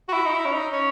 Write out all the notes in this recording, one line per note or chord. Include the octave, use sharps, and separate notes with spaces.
F#4
E4
D#4
E4
C#4
D#4
C#4